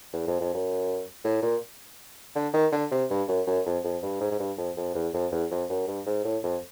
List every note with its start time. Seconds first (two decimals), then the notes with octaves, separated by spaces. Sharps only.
0.13 E2
0.27 F2
0.41 F2
0.55 F#2
1.24 A2
1.42 A#2
2.36 D3
2.54 D#3
2.72 D3
2.91 C3
3.10 G2
3.28 F#2
3.47 F#2
3.66 F2
3.84 F2
4.02 G2
4.21 G#2
4.31 G#2
4.39 G2
4.57 F2
4.77 F2
4.95 E2
5.14 F2
5.32 E2
5.51 F2
5.70 F#2
5.88 G2
6.06 G#2
6.25 A2
6.43 F2